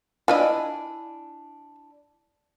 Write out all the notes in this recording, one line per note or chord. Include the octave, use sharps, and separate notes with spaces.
D4 E4 F4 B4 D#5 G#5